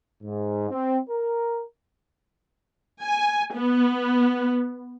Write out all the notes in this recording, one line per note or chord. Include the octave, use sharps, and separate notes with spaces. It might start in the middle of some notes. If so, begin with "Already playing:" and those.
G#2
C4
A#4
G#5
B3